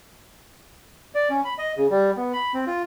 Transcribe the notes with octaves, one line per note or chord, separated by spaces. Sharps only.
D5
C#4
B5
D#5
C#3
G3
B3
B5
C4
F4